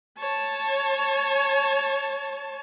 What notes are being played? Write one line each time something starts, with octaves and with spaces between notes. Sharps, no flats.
C#5 A5